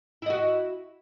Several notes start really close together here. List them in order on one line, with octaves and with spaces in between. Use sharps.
E4 D#5 F#4